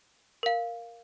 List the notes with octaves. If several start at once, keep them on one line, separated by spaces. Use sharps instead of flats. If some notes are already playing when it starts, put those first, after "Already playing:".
A#4 F5